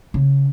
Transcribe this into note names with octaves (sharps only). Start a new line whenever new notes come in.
C#3